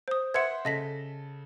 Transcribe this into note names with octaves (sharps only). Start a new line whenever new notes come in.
C5 D#6
C5 E5 F#5 G#6 C#7
C#3 A4 D#5 A#6 B6